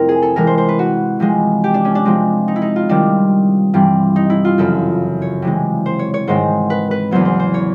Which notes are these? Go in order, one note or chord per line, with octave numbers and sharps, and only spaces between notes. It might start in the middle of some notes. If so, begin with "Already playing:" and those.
Already playing: F2 C3 F3 A3 C4 E4 A#4
G#4
A4
C3 E3 G#3 A#4
C5
C5
B4
F#4
C3 F3 G#3
G4
D4
C#4
D4
C3 F3 G#3 C4
D#4
E4
D#4
F4
C3 D#3 G3 C4 D4
G2 E3 G3 C4
D#4
E4
F4
F#2 C#3 F3 A4
C#5
C3 E3 G#3
C5
C#5
C#5
G#2 D#3 G#3 C4 C5
B4
B4
E2 C#3 F#3 B3 C5
C5
C5
C#5